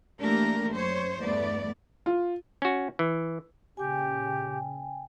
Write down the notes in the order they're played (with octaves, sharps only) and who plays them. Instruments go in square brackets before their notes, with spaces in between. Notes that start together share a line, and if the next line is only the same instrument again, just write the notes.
[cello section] E3 A3 A#3 D4 G4 A#4
F#2 C5 C#5
E2 G2 A3 B3 D5
[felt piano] F4
[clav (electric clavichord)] C#4 F#4
E3
[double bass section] A#2 C#3 [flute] G4 [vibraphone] G5 G#5